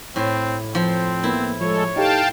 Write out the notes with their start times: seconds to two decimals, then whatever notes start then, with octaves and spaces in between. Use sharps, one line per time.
0.16 A2 C4
0.75 F3 C4
1.24 A#3 B3 E4
1.61 F3 G#3 A4 C#5
1.96 D#4 G4 A4 F5 G5 A5